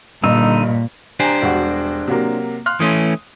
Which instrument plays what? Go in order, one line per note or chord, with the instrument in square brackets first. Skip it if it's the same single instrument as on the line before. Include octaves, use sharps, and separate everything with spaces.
[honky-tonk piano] G2 D#5 [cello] A#2 [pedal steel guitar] D3 D#4 E6
[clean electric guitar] D4 G4 C5 [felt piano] G#5 A#5
[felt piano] E1 G3 F#4
C3 F#3 A#3
C6 F6 F#6
[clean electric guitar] E3 A3 C#4 [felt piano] C6 D#6